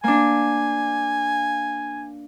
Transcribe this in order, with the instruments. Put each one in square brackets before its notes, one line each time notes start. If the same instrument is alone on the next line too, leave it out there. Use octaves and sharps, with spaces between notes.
[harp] A#3 D4 [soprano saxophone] G#5